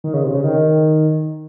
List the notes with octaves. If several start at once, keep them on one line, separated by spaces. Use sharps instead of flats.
D#3
C#3
C3
C#3
D#3